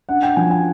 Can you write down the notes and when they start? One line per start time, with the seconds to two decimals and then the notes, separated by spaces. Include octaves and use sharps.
0.09 D4 F#5
0.23 G5
0.36 F3 G#5
0.50 G#5